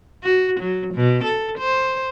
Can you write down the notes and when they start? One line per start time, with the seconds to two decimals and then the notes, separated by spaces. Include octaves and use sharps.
0.24 F#4
0.60 F#3
0.94 B2
1.24 A4
1.59 C5